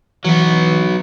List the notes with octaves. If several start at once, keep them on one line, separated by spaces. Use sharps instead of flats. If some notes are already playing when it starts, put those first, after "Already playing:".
E3 F#3 B3